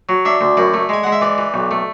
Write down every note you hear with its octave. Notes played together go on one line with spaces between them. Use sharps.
F#3
D4 E5
D2
F#2 D5
A3
G#3 G#5
G#3 F#5
E5
E3 D5
E3
B1
A3